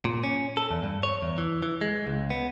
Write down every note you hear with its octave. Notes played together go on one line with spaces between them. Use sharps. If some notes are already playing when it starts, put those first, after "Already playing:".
A#2
C#4
A4
E2
G2
C#5
E2
E3
E3
G#3
C#2
B3